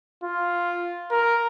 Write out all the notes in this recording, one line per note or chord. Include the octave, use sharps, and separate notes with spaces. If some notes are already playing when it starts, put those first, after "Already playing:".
F4
A#4